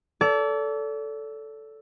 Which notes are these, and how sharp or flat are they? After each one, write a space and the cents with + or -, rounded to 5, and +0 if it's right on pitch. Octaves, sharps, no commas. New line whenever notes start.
A4 +0 D5 -35